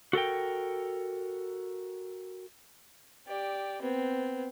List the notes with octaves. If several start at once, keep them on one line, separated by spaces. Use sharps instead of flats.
F#4 A4 A#4 G5
G4 D5
B3 C4